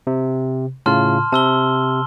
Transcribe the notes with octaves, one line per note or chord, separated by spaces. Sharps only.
C3
A2 C#3 F4 A5 C6 F6
C3 A5 E6 G7